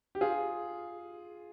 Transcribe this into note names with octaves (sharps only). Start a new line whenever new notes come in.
G4
F4 G#4